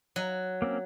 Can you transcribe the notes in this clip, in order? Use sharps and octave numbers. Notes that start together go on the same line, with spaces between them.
F#3
A#3 C4 C#4